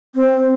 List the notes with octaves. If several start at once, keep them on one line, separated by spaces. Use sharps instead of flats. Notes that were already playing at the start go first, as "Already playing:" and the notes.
C4